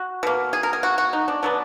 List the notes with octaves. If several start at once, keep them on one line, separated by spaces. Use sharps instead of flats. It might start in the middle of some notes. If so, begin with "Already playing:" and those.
Already playing: F#4
B2 A#3
G#4
A#4
G#4
F#4
F#4
D#4
D4
B2 F#3 B3 D4